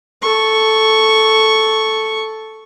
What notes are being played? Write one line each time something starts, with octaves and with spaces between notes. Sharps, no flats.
A4 C#6